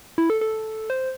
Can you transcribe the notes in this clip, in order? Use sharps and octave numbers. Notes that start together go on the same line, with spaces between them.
E4
A4
A4
C5